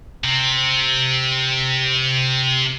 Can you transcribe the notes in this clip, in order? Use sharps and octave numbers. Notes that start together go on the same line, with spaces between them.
C3 C4